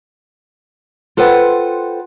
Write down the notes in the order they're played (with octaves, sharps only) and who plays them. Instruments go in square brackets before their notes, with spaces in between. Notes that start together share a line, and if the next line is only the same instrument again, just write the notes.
[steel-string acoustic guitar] F4 A4 B4 C5 F#5 G5